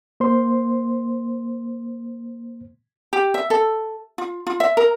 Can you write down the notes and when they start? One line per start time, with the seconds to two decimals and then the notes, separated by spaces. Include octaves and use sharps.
0.20 A#3 C5 C6
3.13 G4
3.34 E5
3.50 A4
4.18 F4
4.47 F4
4.60 E5
4.77 A#4